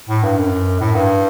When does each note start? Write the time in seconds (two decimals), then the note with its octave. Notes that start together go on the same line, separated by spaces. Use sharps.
0.09 A2
0.23 G2
0.38 F#2
0.80 A2
0.95 G2